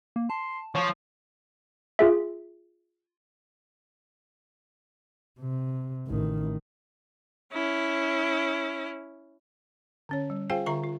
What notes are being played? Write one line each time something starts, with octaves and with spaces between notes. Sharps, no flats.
A#3
A5 C6
F3 C#5 C#6
F4 G#4 E5
C3
A1 D#3
C#4 E4
D3 C#4 C#5
G3
F4 G#4 C5 F5 G5 G#5
D3 F4 E5 A#5 C#6
F4